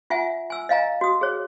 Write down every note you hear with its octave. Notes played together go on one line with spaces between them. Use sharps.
F4 E5 F#5 G#5
G#5 E6
D#5 F5 G#5 A#5
F#4 D#6
G#4 C#5